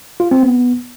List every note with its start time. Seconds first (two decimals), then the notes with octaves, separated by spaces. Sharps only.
0.20 F4
0.31 C4
0.43 B3